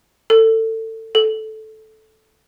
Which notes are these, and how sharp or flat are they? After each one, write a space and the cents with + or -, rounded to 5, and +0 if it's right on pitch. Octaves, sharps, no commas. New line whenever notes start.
A4 +25
A4 -10